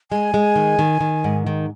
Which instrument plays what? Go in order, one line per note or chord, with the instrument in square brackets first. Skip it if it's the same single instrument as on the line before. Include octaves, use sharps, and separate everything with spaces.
[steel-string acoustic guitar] G#3 [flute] G#5
[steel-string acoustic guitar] G#3
D#3
D#3
D#3
G#2
D#3